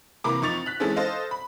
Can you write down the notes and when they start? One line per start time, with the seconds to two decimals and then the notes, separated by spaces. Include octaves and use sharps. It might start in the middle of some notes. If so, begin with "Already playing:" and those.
0.24 C3 E3 A#3 A#5 B5 D6
0.42 F2 D#4 C#6 A6 F7
0.66 F#6 B6
0.80 E3 G#3 C#4 D#4 A4
0.96 A4 C5 D#5 F5
1.31 B5